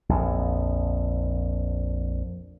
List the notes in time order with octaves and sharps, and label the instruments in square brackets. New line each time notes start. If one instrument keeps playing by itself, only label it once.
[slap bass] A#1 F2